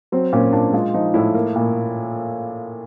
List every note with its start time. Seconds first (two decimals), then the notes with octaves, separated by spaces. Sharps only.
0.12 F#3 C4
0.33 A#2 C#4
0.53 A#2 D4
0.73 G#3 F4
0.94 F3 D#4
1.14 A2 E4
1.34 A#3
1.55 A#2